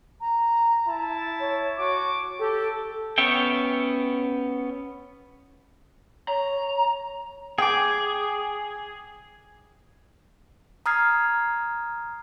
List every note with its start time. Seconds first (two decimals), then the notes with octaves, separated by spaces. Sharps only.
0.21 A#5
0.88 E4 A5
1.40 C#5
1.78 F#4 D6
2.39 G4 A4
3.18 B3 C#4 C#5 E5 G5
6.28 C#5 A#5
7.58 G#4 G5 D6
10.86 A#5 D#6 F6 G#6 C7